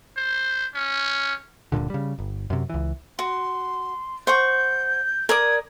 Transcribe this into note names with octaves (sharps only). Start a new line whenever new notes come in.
C5
C#4
D1 G2 A#2 D3
C#3 G3
G1
F#2 C3
C#2 E3
F#4 C6
C5 F#5 C#6 G6
A#4 D5 D#6 G#6